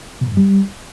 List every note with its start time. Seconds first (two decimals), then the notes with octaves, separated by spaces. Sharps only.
0.21 B2
0.26 G#2
0.32 G2
0.37 G3